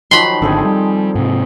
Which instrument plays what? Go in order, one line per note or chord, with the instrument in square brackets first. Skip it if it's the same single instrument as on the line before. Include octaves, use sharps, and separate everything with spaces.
[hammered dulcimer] D#3 F3 F#3 [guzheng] B5 C6
[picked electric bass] G#1 D3 [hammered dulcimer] C4 G#4 A4
[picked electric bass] G3
G#2 C3